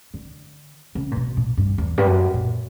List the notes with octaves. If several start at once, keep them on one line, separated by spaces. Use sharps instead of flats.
D3
C#3
A#2
B2
A#2
G2
E2
G2
F#2
A#2